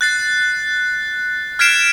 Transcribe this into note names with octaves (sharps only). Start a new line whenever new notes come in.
F#6 A6 C7
F6 G#6 B6 C7 D7 E7